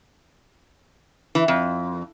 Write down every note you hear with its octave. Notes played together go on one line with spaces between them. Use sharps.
E3
F2